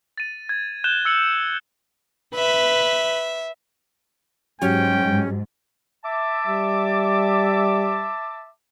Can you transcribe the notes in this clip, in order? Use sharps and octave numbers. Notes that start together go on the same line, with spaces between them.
A6 D#7
G#6
F#6 G6 E7 G7
E6 C#7 F#7
B4 E5
G#2 F#3 C#4 F#4 G4 G5
E5 A5 D6
G3